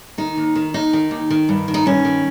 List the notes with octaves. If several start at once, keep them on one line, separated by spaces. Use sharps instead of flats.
D#3 D#4
D#2
D#3
D#2 D#4
D#3
D#2
D#3
G2
D#3
D#4
G2 C#4
D#3